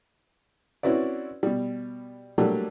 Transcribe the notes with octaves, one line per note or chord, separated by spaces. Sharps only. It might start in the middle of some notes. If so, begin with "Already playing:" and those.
C4 C#4 E4 F#4 B4 D5
B2 G3
F#3 G3 A3 A#3 D4 G4